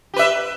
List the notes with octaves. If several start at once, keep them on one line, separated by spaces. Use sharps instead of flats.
G4 B4 E5